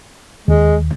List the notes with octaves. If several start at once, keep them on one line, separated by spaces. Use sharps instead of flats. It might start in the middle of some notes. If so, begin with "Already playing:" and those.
D#2 G#3